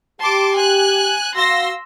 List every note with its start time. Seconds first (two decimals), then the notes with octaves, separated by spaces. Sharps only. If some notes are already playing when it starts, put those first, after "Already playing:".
0.21 G4 A5 C6 D6
0.54 G#5 F#6
1.36 F#4 F5 C6 E6 A#6